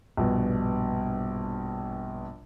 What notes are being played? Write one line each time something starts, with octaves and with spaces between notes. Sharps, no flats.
A#1 G2 B2